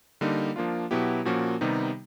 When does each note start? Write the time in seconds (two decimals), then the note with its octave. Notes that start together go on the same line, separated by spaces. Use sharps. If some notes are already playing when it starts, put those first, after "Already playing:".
0.21 D3 G3 A#3 D#4
0.56 F3 A#3 D4 F4
0.91 B2 F#3 B3 E4 G4
1.25 A#2 F3 A#3 C#4 F#4
1.61 C3 D#3 G3 B3 D#4